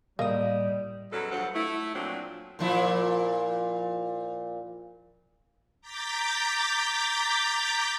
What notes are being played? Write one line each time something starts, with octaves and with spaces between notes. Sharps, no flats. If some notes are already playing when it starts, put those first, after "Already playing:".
A2 G3 A#3 D#5 D#6
E2 F#3 G#3 C#4 A4
D2 G2 F3 F#3 A4 F#5
A3 E4
A#2 F3 F#3 C4 D4
A#2 F3 E4
A#5 D6 G6 A6 B6